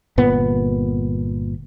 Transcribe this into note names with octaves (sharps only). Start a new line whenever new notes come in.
G1 A#2 B3